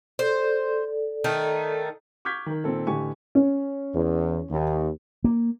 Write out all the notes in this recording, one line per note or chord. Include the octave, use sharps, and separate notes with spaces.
A4 C5 D5
D#3 A3 D#4
C#6 D6 F6 G6 G#6 B6
D#3 A#4
A#2 D#3 C4 A4
A1 D3 G4 G#5 C#6
C#4
E2
D#2
A#3